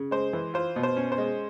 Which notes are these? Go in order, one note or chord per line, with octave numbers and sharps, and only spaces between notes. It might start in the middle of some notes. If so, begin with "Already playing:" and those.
Already playing: C#3
G#3 C5
E3
F4 C5
B2
C5
C#4
C5
G#3